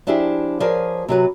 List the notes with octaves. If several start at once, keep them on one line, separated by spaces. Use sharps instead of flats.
F3 D4 E4 G4 G#4
F3 G#4 A#4 C#5 D5 F5
C3 F#3 B4